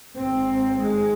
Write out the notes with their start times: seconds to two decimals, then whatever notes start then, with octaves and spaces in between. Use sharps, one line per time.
0.17 G#1 G#2 C4
0.81 G#3